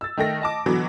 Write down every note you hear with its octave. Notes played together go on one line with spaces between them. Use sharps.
E6 A6
D#3 A3 G5 A#6
D#5 A5 D6
B2 D3 E3 F#3 B3